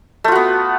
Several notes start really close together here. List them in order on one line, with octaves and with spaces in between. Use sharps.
A3 F4 F#4 B3